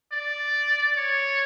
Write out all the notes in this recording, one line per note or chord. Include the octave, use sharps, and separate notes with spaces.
D5
C#5